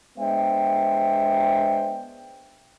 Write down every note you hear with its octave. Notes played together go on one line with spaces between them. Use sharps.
G#3 B3 D4 C5 E5 G5